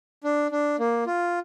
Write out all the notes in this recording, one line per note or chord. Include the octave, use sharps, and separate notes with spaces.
D4
D4
A#3
F4